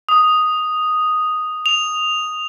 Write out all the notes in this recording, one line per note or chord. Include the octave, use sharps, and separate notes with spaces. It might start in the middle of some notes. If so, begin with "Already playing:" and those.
D#6
F7